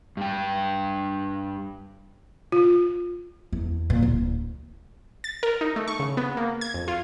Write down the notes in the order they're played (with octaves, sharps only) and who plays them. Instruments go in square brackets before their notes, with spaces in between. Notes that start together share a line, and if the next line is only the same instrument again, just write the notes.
[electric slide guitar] G2 G5
[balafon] F4
[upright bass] E2
A#2
D1
[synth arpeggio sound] A6
A#4
D#4
A3
C#6
C#3
B3
A#3
G#6
F2
F4